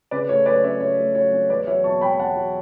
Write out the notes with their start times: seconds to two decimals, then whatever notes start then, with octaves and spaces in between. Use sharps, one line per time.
0.11 C#3 B4 D5
0.29 A3 C#5
0.46 F#3 B4 D5
0.63 C#4 C#5 E5
0.80 C#3 C#5
0.98 A3
1.15 F#3 C#5
1.32 C#4
1.50 E2 B4 D5
1.67 F#3 C#5 E5
1.84 B2 A5 C#6
2.01 E2 G5 B5
2.19 E2 F#5 A5
2.36 F#3